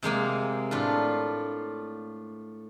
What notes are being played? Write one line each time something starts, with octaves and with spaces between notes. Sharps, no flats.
C3 G#3 A#3 G#5
A2 D4 F4